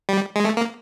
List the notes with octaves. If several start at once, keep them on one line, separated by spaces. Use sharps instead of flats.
G3
G#3
A3
A#3